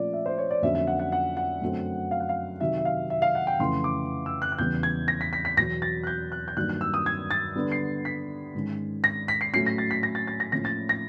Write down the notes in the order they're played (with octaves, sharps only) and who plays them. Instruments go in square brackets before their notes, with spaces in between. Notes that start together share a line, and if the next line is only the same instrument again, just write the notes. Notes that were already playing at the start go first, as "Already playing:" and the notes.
Already playing: [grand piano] A#2 F3 A3 C#4 D5
E5
C5
C#5
D5
F2 D3 F#3 A#3 C#4 E5
E5
F#5
F#5
F#5
F#5
F#2 D3 F#3 A3 C4
F5
F#5
F5
C3 D#3 F#3 E5
E5
F5
E5
F5
F#5
G5
F2 C#3 E3 A3 C#4 C6
D6
E6
F#6
F#6
E2 C#3 E3 G3 B3 G6
G#6
A#6
B6
B6
B6
E2 B2 F#3 A#6
A6
F#6
G6
F#6
G6
G2 D#3 F#3 A#3 F#6
F#6
E6
D#6
G#6
A6
D3 G3 B3
C7
B6
G#2 D#3 G#3 C#4
A#6
B6
C7
A2 F#3 A3 C#4 C7
A#6
A6
B6
A#6
A6
A6
A#6
A2 F3 A#3 C#4 A#6
A6
A#6